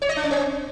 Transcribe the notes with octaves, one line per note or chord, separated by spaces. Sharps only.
C#5
D#5
D4
C#4
C4